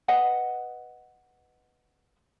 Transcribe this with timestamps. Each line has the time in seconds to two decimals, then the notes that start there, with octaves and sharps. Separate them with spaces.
0.08 B4 D#5 F#5